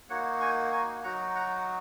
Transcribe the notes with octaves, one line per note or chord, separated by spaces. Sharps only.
A#3 D#4 F#4 C#5 F#5
G#5 C#6
G#5 C#6
F#3 D#4 F#4 F#5 A#5
F#5 A#5